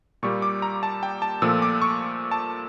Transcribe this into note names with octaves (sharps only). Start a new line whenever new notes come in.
A#2 G3 A#3 C#6
D6
A#5
A5
G5
A5
A#2 F3 A3 E6
D6
C#6
A5